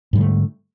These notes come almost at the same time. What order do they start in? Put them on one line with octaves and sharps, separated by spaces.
G#2 G3 D3 A3